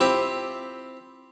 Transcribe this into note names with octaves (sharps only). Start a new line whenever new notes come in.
C4 E4 F4 G4 C5